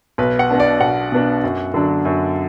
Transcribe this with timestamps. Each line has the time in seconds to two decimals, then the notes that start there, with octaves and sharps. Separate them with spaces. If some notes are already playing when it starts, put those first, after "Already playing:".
0.18 B1 B4
0.39 F#5
0.50 B2 B3 D4
0.60 D5
0.81 B1 F#5
1.12 B2 B3 D4
1.44 F#2
1.74 D3 F#3 D4
2.05 F#2